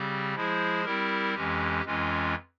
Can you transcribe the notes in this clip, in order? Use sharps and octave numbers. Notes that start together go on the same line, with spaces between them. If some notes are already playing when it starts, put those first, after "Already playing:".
Already playing: C#3 G3 C4 G4
F3 G#3 E4 G#4 C5
G3 C4 E4 G4 A#4
F2 E3 G#3 C#4 G4
F2 E3 G#3 C#4 F4